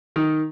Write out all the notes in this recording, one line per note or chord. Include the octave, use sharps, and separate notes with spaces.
D#3